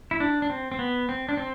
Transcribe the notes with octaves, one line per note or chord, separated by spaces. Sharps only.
E4
D4
D4
C4
C4
B3
C4
D4
C4